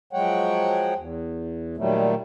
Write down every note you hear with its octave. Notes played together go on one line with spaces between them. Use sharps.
F3 F#3 G#3 C#5 F#5 G5
E2
A#2 D#3 F#3 G3 A3